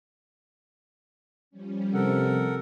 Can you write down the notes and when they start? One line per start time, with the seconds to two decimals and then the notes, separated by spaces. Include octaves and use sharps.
1.51 F3 G3 C#4
1.94 C3 A4 A#4 F#5